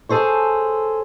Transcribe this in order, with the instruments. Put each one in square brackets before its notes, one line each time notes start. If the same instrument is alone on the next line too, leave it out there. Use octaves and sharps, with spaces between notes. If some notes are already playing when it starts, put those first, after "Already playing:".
[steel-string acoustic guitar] G#4 A4 C5 C#5